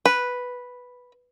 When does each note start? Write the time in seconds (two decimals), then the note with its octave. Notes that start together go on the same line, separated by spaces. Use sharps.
0.05 B4